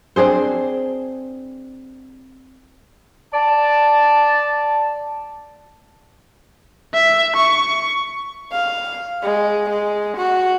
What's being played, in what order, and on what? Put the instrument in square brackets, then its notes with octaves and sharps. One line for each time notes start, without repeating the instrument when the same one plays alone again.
[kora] C4 D4 G#4 C5
[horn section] D5 A5
[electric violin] E5
C#6
[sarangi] F5
G#3
G#3
F#4